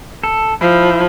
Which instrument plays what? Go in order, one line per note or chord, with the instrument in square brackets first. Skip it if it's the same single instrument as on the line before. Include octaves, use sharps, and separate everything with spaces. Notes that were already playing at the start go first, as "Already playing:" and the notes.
[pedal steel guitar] A4
[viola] F3 [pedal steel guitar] E4